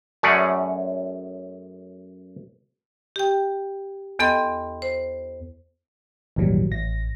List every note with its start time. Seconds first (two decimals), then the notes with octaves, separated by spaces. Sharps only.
0.23 F#2 A3 C#4 G#4 D5 F#5
3.16 G4 G5
4.19 E2 B3 A4 D#5 G5 C6
4.82 C5
6.36 G#1 D#2 A#2 E3 F#3 G3
6.71 A1 A#6